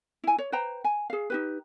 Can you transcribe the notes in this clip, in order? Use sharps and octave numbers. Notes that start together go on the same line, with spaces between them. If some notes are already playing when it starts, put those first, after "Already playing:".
E4 G#5
C#5
B4 C5 G5 A#5
G#5
G#4 F5
D#4 G4 B4